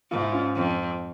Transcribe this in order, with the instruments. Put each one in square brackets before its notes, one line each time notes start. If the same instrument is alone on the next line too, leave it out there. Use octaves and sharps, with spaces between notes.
[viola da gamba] G#2 [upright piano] F4
[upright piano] E4
C#4 F4
[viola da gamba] F2